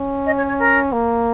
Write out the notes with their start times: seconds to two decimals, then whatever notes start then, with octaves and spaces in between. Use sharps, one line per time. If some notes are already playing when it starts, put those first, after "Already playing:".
Already playing: C#4
0.26 D#5
0.37 C#5
0.48 C#5
0.59 A#4
0.93 A#3